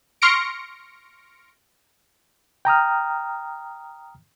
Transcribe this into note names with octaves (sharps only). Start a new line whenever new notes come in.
C6 C#6 F6 A#6 C#7 D7
G5 A#5 D#6 F6